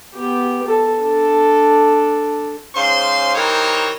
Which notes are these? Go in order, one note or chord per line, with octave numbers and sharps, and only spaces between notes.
B3 G4
A4
D4 A4
G#2 C#4 C5 F5 C6
E3 D#4 G4 A#4 C5 C#5